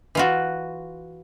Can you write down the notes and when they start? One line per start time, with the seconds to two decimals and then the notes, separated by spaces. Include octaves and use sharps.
0.15 E3 F4 F#4